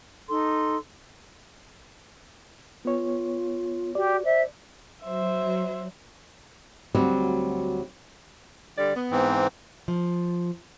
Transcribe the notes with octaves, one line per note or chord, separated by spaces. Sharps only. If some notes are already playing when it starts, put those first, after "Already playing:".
D#4 A4 C6
B3 F4 C#5
F#4 G4 D5
C5 E5
F#3 C5 E5
D2 F#3 G3 C4
D3 G3 D5
B3
G#2 E3 C4
F3